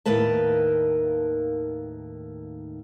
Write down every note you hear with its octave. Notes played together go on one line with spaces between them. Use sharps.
D#2 A2 D#3 A#3 B4 A5